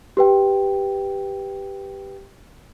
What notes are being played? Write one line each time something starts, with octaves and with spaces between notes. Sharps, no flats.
G4 B4 G5